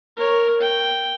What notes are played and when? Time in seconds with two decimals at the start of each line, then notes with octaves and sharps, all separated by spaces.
0.16 A#4 C#5
0.61 G5